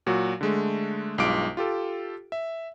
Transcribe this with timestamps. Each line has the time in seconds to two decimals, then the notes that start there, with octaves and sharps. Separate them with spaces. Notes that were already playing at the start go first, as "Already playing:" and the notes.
0.07 A#2 F#3 F#4
0.41 D3 G#3 A3
1.18 B1 G2 G#3 F4 D6 D7
1.57 F4 G4 A4
2.32 E5